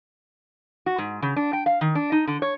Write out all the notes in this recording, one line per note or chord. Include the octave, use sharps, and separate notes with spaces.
F#4
G#2
C#3
D4
G5
F5
D#3
D4
D#4
D3
C#5